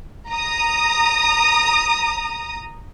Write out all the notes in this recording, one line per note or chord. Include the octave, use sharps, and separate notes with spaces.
A#5 D#6